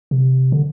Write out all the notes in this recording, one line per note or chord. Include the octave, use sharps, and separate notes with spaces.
C3
D3